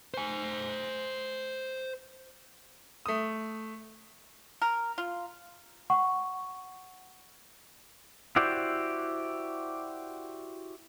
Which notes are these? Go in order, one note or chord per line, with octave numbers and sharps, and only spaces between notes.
C5 G#5
A3 D#6
A#4
F4
F#5 C#6
E4 F#4 G4 C5 D5